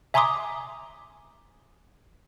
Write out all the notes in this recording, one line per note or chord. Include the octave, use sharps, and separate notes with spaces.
E5 G#5 A#5 C6 D6 D#6